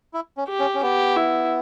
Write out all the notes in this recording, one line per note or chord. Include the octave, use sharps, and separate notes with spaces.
E4
C#4
G4
C#4
C#4
B3 G4
E4